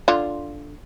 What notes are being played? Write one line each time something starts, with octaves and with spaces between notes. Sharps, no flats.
D3 F4